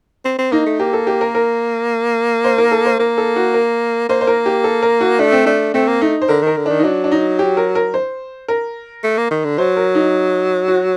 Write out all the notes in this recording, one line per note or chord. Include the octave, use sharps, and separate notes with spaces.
C4
C4
A#3 D#4
A3
A#3 G4
A4
G4
A#4
A#4
C5
A#4
A4
C5
A#3 A#4
A4
F#4
A#4
A#3 C5
C5
A#4
G4
A4
A#4
F#4
A3 D4
C4
A3 D4
A3 C4
A#3
A3 D#4
C5
D3 A#4
D#3 A#4
D3
D#3 D4
D#4
F#3 D4
D4
D#4
G4
A#4
A#4
C5
A#4
A3
A#3
D#3
D3
F#3 C5
A#4
D#4
F#4